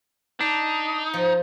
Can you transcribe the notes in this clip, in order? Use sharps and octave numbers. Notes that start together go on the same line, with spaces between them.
D4 D#4
F3